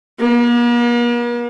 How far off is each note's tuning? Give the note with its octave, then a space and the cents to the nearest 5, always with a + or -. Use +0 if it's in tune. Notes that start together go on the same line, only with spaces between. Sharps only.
A#3 +45